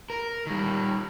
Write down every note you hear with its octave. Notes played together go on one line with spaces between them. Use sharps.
A#4
D#3 G3